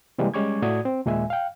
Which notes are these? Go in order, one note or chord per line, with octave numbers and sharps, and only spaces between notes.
C3 E3 G3 G#3 A#3
G3 G#3 C#4 C#6 D6 G#6
A2 A3 F#4 D5 D#6 G#6
C4
D#2 A#2 G#3 E5 G#5
F5 G5